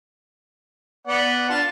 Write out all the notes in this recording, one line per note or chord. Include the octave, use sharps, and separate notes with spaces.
B3 D5 F#5
D4 F4 A5